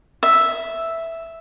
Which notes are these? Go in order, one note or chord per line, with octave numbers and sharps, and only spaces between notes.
E5